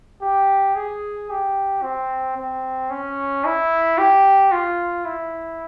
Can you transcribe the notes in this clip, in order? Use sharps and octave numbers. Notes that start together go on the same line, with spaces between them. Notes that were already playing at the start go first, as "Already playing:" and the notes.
G4
G#4
G4
C4
C4
C#4
E4
G4
F4
E4